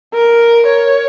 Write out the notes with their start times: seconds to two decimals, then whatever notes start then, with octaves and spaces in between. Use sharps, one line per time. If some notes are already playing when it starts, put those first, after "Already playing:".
0.14 A#4
0.66 C#5